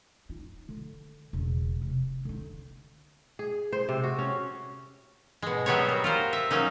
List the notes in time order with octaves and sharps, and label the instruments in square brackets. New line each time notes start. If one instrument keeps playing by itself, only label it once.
[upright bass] D#4 F4
D3
E1 C#3
C3
D3 D#4
[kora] G#4
C5
C3
F#4
C#4
[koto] B2 G#3
F#3 G3 B3 G4 G#4 C#5
A#4
F4 A#4 C5
E5
F#3 A#3 C#4 D#4